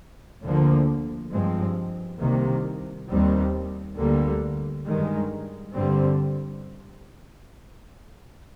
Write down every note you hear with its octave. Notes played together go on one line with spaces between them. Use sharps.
D2 D3 F3 A#3
G2 F3 G#3 C4
C2 C3 D#3 A#3
D#2 D#3 G3 C4
D2 D3 G3 A#3
G2 D#3 G#3
G2 D3 G3 C4